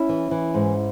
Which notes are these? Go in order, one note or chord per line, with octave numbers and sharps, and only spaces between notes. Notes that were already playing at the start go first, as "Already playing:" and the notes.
Already playing: C#4 E4
E3
E3
G#2